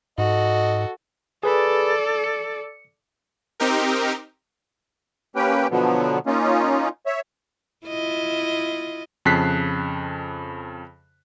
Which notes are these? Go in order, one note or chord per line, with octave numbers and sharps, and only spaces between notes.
G#2 F#4 A4 D#5
G#4 A4 B4 D5 B5
C#7
C4 D#4 G4 A#4
A#3 C#4 G4 B4 G5
B2 D3 F3 F#3 B3
A#3 C#4 D#4 F4
C#5 E5
E4 F4 D#5
F2 C#3 A5 F#6 B6 C7